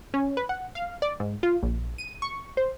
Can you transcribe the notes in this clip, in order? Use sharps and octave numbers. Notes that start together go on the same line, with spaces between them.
C#4
B4
F#5
F5
D5
G#2
F4
A#1
D#7
C#6
C5